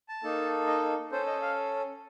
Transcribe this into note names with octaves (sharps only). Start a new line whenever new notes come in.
A5
A#3 D#4 A4
D#5
C#4 A4 C5
D#5
F5